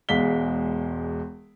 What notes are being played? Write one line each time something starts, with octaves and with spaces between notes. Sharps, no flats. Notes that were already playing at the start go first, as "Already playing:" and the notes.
E1 E2 G#3 F5 B6 G7